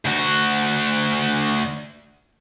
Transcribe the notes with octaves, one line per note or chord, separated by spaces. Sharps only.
D2 F#4